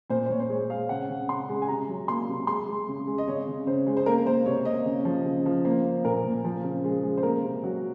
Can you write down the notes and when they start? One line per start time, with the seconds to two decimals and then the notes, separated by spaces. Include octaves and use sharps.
0.10 A#2 C5
0.26 C5
0.30 A#2 C#5
0.40 C5
0.49 G#3 C#5
0.70 G#3 F5
0.89 C#3 F#5
1.09 C#3
1.29 C#3 C6
1.49 G#3
1.62 G#5
1.68 C3 A#5
1.88 F#3
2.08 A#3 C6
2.29 C3
2.47 G#3 C6
2.68 G#3
2.88 C#3
3.07 G#3
3.18 D#5
3.28 C#3 C#5
3.47 C#3
3.67 C#3 C5
3.87 G#3
3.97 C5
4.06 A#3 A#4
4.26 A#3 C5
4.46 C3 C#5
4.65 A#3 D#5
4.85 C#3
5.05 F3
5.25 C#3
5.46 F3
5.65 A#3 C5
5.84 A#3
6.05 A#2 A#4
6.24 A#2
6.45 F3
6.63 C#3
6.84 G#3
7.03 G#3
7.18 C5
7.23 A#3 A#4
7.43 C3
7.63 F#3 F#4